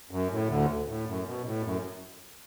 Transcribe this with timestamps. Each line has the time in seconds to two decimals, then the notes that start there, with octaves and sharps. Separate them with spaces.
0.11 F#2
0.31 A2
0.49 D2 D3
0.88 A2
1.07 F#2
1.25 B2
1.45 A2
1.64 F#2